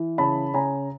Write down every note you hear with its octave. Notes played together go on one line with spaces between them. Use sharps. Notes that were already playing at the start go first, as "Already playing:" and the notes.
Already playing: E3
C#3 A5 B5
C#3 G#5 A#5